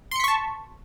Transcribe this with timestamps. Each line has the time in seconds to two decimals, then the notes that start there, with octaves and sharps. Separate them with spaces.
0.11 C6
0.16 C#7
0.20 B6
0.24 C#6
0.28 A5